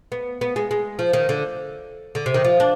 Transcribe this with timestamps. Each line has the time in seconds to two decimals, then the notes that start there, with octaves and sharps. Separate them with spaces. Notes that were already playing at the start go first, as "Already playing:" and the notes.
0.12 B3
0.41 B3
0.56 G#3
0.71 G#3
0.99 F3
1.13 D#3
1.29 D3
2.15 D3
2.26 C3
2.34 D#3
2.45 F3
2.60 D4